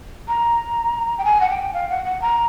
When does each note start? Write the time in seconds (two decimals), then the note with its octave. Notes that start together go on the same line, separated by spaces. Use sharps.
0.28 A#5
1.18 G5
1.25 G#5
1.41 F#5
1.50 G5
1.74 F5
1.90 F#5
2.05 F#5
2.22 A#5